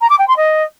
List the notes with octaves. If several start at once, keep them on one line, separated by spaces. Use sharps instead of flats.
A#5
D6
G5
C6
D#5